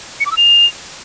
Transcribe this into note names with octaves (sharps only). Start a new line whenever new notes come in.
C#7
D6
E6
F7